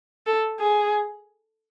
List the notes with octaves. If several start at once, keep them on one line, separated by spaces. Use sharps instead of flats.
A4
G#4